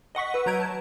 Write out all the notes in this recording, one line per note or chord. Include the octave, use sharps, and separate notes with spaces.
D#5 F#5 C#6 B6
B4 E6
F#3 A#5 G6 G#6 D7
A5